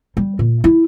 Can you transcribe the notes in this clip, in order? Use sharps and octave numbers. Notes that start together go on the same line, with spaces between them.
G3
A#2
E4